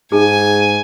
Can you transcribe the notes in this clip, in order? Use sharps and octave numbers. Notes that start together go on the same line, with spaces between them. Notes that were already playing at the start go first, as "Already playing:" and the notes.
G#2 D#4 G#4 G#5